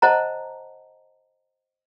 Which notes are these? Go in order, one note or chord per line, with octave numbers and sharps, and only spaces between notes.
C5 D#5 F#5 A5 A#5